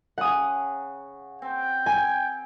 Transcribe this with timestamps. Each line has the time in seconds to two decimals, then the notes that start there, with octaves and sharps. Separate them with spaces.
0.18 C#3 F#5 D#6
1.42 C4 G5
1.86 G#5